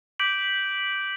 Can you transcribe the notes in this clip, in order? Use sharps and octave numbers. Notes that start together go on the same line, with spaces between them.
D6 G6 B6 D7 F#7